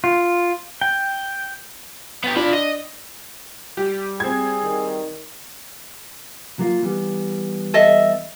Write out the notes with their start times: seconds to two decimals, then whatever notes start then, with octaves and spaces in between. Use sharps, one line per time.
0.04 F4
0.81 G5
2.24 B3 G4
2.36 D4 F4 B5
2.54 D#5
3.77 G3 G4
4.20 C4 G#4 G#6
4.64 D#3
6.59 F#3 A#3 F4
6.83 E3 G3 B3
7.74 A4 D#5 E5